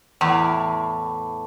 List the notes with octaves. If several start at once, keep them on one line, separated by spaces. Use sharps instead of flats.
E2 A2